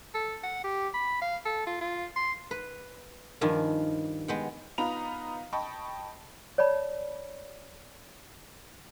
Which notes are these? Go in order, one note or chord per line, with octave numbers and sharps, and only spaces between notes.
A4
F#5
G4
B5
F5
A4
F4
F4
C6
B4
G2 D#3 F3 G#5
G#3 B3 G5
B3 D#4 F4 A#5 B5 F7
D#5 G5 A5 B5 C#6
C#5 D5 A5 B5